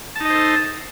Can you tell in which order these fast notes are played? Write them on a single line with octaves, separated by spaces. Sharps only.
A5 D#4 D#5 C5 A4